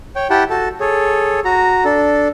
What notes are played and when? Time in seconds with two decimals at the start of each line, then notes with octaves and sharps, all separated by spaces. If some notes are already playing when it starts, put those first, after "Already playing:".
0.16 C#5 G5
0.30 E4 G4 F#5 G5 A5
0.50 F#4 A4 A5
0.80 G#4 A4 C#5
1.45 F#4 A#5
1.84 D4 A4